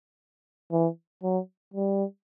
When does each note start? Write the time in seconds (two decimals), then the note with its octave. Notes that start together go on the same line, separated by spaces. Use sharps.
0.72 E3
1.23 F#3
1.74 G3